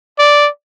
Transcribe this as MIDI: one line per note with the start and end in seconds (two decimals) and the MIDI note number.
0.19 0.48 74